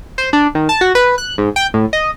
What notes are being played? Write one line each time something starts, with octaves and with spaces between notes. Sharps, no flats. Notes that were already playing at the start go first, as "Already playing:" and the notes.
C5
D4
D#3
A5
F#4
B4
F#6
G#2
G5
A2
D#5